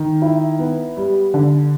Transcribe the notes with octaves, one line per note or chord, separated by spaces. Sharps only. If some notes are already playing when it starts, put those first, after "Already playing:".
Already playing: D#3
E4
B3
G3
D3